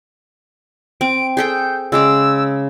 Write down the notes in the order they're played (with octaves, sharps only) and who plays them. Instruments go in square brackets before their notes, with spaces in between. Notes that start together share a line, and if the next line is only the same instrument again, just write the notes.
[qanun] C4 [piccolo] D7
[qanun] G#4 A4 G5 [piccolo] G6
[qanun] C#3 G#3 D6 [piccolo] E6